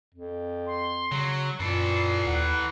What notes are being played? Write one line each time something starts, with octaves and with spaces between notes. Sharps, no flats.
F2
C6
C#3 F#3
F#2 A#2 E3 A4 C7
D#2 F#5